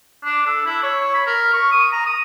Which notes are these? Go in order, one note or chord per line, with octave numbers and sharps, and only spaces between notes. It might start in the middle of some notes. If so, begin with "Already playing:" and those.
D4
A4
E4
C#5
B5
A#4
C#6
D#6
A#5
D#6